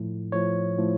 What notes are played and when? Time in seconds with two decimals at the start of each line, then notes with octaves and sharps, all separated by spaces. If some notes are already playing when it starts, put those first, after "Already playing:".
Already playing: A2 F3
0.32 A2 F3 C#5
0.78 A2 F3